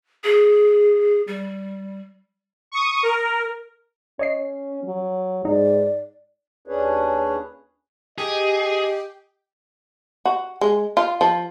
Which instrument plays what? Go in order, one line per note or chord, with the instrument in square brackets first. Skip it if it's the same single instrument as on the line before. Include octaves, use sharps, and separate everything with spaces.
[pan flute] G#4
G3
[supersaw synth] C#6 D#6
A#4
[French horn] C#4 [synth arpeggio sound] C#5 D#5 C7
[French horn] F#3
[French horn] G#2 [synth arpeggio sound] D#4 [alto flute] D5
[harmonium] D#2 C#4 D4 G#4 B4 C#5
[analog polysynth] G4 [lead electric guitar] G#4 [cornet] D#5
[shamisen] F#4
G#3
F4
F3